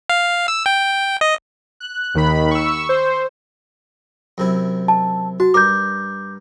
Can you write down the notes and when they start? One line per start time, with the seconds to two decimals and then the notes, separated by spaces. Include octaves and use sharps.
0.09 F5
0.48 E6
0.66 G5
1.21 D#5
1.80 F#6
2.15 D#2 D#3 B5
2.51 C#6 E6
2.89 C5
4.38 F#2 C3 E4
4.88 A5
5.40 F#4 A5
5.54 G2 A#4 D6 G6